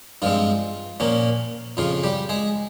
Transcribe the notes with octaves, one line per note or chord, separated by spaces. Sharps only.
G2 F3 G#3 C4 F4
A#2 F3 A#3 C#4
F2 C#3 F3 F4
G3 G4
G#3 G#4